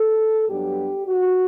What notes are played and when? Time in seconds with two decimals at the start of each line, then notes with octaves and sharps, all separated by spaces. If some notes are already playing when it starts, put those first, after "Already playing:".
Already playing: A4
0.49 G2 F#3 B3 D4 G4
1.07 F#4